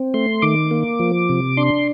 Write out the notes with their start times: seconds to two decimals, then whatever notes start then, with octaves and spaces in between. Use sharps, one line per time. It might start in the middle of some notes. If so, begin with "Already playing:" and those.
Already playing: C4
0.14 A3 C6
0.42 D#3 D6
0.71 A#3
1.00 F3
1.29 C3
1.57 D4 C6